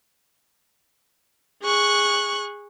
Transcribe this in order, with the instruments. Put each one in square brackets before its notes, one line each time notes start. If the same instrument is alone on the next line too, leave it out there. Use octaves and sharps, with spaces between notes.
[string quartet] G#4 C#6 F#6